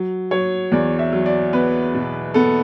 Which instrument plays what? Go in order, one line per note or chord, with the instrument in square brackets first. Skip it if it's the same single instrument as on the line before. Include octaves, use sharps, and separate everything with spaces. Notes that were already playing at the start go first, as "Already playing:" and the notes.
Already playing: [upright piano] F#3
F#3 C#5
E2 D5
E5
F#3
D5
B3 B4
B2
B3 A4